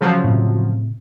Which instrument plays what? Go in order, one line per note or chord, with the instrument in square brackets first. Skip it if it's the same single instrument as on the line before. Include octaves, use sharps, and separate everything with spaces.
[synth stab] C#3 F3 F#3
[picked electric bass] A2 C3